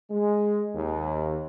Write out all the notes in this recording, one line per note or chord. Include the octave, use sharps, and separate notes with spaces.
G#3
D#2